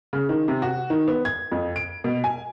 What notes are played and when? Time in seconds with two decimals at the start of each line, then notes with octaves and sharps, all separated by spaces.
0.13 C#3
0.29 D#3
0.48 C3
0.62 F#4
0.90 D#3
1.08 B3
1.25 G#6
1.52 F2
1.76 D7
2.04 B2
2.24 G#5